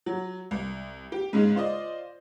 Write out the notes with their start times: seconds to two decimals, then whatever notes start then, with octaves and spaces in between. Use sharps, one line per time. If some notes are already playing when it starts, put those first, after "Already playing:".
0.06 F#3
0.51 C2
1.12 G4
1.33 G#2 C#3 G#3
1.55 F4 C5 D5 D#5